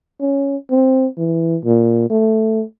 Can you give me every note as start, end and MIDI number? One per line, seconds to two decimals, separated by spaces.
0.20 0.56 61
0.70 1.06 60
1.17 1.57 52
1.64 2.09 46
2.10 2.63 57